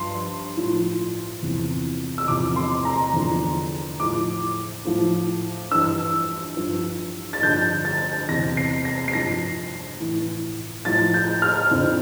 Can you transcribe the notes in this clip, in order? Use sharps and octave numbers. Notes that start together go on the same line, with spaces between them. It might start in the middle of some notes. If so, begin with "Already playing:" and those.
Already playing: G2 F3 C6
A2 F3
E2 C3 E3
E6
E2 C3 F3 D6
C6
A#5
E2 D3 F3
A2 F3 D6
A2 F3
G2 E3 E6
G2 F3
A6
G2 D3 F3 G6
A6
E2 C3 E3 A#6
C7
A#6
C7
G2 F3 A#6
A2 E3
A2 F3 A6
G6
F6
F2 D3 F3